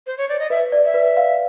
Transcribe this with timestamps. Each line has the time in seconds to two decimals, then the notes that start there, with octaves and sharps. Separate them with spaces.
0.07 C5
0.18 C#5
0.29 D5
0.39 D#5
0.50 B4 E5
0.72 D5
0.84 E5
0.94 B4
1.17 F5